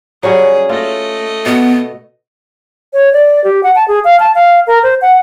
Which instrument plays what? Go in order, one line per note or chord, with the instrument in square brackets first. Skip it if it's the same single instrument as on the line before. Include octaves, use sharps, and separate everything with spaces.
[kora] F#3 G3 C#4 [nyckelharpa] G#4
[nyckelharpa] A3 D#5 [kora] F4
[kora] B2 [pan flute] B3
[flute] C#5
D5
G4
F#5
A5
G#4
F5
A5
F5
A#4
C5
F#5